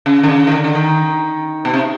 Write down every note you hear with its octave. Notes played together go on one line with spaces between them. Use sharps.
C#3
D3
C#3
D#3
D3
D3
D#3
B2
C3